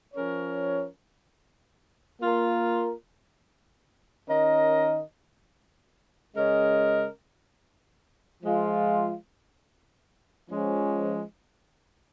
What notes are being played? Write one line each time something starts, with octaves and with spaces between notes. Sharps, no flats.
F3 C#4 A#4 C#5
A#3 F4 A#4
D#3 C#4 A#4 D#5
C#3 G#3 C#4 A#4 D#5
F3 G#3 F4
F3 G#3 C#4